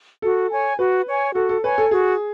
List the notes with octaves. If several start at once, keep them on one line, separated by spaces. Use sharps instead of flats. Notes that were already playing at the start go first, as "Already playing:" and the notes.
F#4 A4
C#5 G#5
F#4 B4
C#5 G#5
F#4 A4
A4
B4 C#5 G#5
A4
F#4 G#4